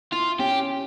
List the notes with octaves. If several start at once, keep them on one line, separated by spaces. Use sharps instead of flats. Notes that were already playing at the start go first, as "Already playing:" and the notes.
E4 F4
C#4 G4